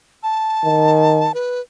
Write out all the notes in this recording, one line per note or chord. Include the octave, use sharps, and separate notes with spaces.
A5
D#3
B4